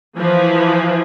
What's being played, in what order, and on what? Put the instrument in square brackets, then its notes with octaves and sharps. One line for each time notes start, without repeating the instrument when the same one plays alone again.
[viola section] E3 F3